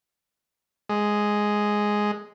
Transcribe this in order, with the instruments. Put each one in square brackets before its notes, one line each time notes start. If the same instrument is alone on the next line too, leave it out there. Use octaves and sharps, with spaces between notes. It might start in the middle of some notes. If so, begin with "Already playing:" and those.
[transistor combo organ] G#3